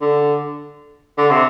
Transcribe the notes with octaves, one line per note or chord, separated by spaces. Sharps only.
D3
D3
C3